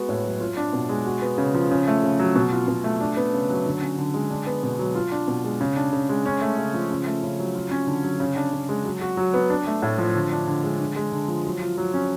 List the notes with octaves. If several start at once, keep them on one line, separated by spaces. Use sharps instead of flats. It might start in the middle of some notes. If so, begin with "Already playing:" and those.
Already playing: G#3 B3 F#4
A2
F#3
F4
D4
B2
G#3
F#4
B3
C#3
F3
C#3
A3
C#3
F#3
B2
F4
B2
A3
D4
B3
C#3
F#3
D3
C#4
D3
G#3
D4
B3
B2
F#3
F4
D4
B2
G#3
C#3
D4
C#3
G#3
C#4
A3
C#3
F3
C#3
A3
C#3
F#3
F4
C#4
D3
F#3
C#3
D4
C#3
G#3
F#3
F#4
F#3
B3
D4
A3
A2
F3
D3
D4
D3
G#3
D3
G#3
D3
F3
F#3
F4
F#3
C#4